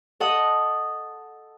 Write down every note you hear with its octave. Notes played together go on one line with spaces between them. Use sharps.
A4 D#5 F#5 D#6